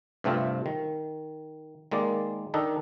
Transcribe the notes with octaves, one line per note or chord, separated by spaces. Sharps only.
G2 C3 A3 C4 F4
D#3
D#3 G#3 A#3 D5
D#3 D4 D#4 A4